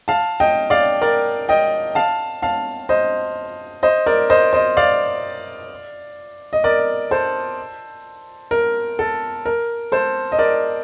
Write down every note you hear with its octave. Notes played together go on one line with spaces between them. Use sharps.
F5 A5
D#5 G5
D5 F5
A#4 D5
D#5 G5
F5 A5
F5 A5
C5 D#5
C5 D#5
A#4 D5
C5 D#5
C5 D#5
D5 F5
D#5
A#4 D5
A4 C5
A#4
A4
A#4
A4 C5
D#5
A#4 D5